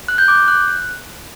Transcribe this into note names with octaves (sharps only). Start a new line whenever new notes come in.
F#6
G6
D6
G6
F#6